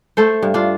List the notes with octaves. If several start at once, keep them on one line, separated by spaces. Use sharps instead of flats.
A3 A4 C5
G2
D4 F4